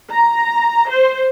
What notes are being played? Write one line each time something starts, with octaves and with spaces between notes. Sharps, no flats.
A#5
C5